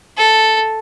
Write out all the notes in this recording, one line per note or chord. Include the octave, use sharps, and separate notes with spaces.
A4